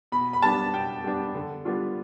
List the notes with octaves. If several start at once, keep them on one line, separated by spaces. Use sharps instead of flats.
B2 B5
B5
G3 B3 D4 A5
B2 G5
G3 B3 D4
D3
G3 B3 D4 F4